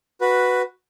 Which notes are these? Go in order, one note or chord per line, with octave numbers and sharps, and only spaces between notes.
F#4 B4